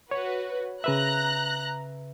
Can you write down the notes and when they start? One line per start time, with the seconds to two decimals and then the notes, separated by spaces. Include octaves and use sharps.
0.11 F#4 B4 C#5
0.84 C#3 B4 E5 A#5 F#6